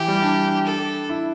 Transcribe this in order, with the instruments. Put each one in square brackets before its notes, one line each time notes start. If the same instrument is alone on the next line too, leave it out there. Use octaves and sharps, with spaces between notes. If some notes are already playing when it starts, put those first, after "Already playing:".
Already playing: [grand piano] E3 [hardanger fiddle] G4
[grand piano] G3
D4
[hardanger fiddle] A4
[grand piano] E4